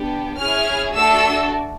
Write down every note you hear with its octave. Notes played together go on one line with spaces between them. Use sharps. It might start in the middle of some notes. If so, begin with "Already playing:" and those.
Already playing: B3 D4 G4
C#4 E4 G#4 F6
A3 D4 F#4 A4 E6